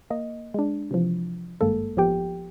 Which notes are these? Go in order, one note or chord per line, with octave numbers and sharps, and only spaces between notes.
A#3 D#5
G#3 D4
C3 E3 F3
G#1 G2 G#3 A#3 A4
A1 F3 B3 G4 G5